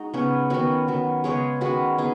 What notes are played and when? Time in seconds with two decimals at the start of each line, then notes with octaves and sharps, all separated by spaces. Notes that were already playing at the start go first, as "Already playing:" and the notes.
Already playing: G#3 D#4 F#4
0.14 C#3 B3 C#4
0.50 D#3 B3 C#4 F#4
0.88 D#3 F#3 B3
1.24 C#3 G#3 B3 G#4 C#5
1.61 D#3 G#3 C#4 F#4 B4
1.98 B3 D#4 G#4